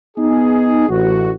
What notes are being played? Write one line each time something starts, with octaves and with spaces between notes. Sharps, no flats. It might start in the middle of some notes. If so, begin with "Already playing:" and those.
B3 D#4 G#4
A1 F#4